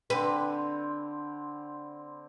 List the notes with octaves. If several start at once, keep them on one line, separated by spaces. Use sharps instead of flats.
D3 C4 B4 B5 C6